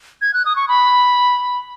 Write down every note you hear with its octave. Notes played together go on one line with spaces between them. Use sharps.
G#6
F#6
D#6
C#6
B5